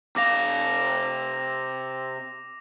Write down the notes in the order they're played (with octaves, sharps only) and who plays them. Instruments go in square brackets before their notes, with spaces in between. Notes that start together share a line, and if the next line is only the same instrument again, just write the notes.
[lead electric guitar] C3 F5 [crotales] D6 A#6 F7